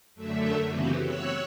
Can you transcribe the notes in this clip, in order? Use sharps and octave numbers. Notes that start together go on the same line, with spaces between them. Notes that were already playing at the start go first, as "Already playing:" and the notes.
F#2 D3 A3 E5
C#3 E3 B3 C4 F#4 G4
C#5 E6 F#6